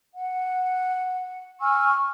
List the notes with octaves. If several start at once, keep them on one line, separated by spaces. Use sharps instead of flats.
F#5
G#5 C#6 E6 F6